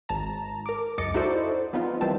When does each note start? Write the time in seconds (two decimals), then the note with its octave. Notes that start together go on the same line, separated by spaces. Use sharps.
0.09 G#1 A5 A#5
0.66 A#4 D6
0.98 C#2 F#2 D#5 D6 A6 C#7
1.14 D#4 E4 F#4 A4 C5 D5
1.73 F3 B3 C4 D#4 F4
2.01 D#3 E3 G3 C4 A5